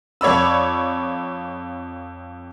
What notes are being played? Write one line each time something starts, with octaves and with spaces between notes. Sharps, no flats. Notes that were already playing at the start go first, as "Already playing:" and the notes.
F2 C#5 D5 B5 E6